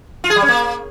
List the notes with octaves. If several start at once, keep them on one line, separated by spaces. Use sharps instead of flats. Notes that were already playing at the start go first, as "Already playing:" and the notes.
F4
G#4
G3
C#4
A#3